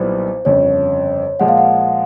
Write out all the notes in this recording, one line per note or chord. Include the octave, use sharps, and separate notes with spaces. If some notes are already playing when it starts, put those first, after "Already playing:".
Already playing: B1 A#2 G3 B3 E4 C5
G1 F2 C#3 C#5
A#2 F3 G#3 F#5
F5
F#5